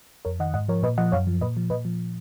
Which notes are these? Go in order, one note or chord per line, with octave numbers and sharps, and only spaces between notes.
F2 A#4 C#5
D#3 D#5 F#5
G#2 D#5 F#5
F3 A#4 C#5
A#2 B4 D#5
F3 D#5 F#5
F#2 C#5 F5
F3
A#2 B4 D#5
F3
A#2 B4 D#5
F3